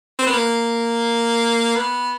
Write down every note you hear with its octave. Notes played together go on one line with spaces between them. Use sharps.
C4
B3
A#3
B3